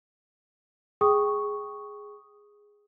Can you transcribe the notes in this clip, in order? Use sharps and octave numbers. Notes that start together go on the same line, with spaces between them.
G#4 G5 C#6 D#6